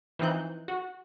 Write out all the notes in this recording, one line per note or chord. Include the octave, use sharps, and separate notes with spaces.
E3 F3 C4 D#4 F#6 G6
F#4